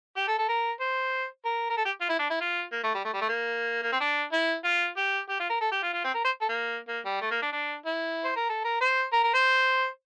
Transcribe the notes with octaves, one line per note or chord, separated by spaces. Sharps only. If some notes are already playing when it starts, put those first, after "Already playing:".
G4
A4
A4
A#4
C5
A#4
A#4
A4
G4
F4
E4
D4
E4
F4
A#3
A3
G3
A3
G3
A3
A#3
A#3
C4
D4
E4
F4
G4
G4
F4
A#4
A4
G4
F4
F4
C4
A#4
C5
A4
A#3
A#3
G3
A3
A#3
D4
D4
E4
C5
A#4
A4
A#4
C5
A#4
A#4
C5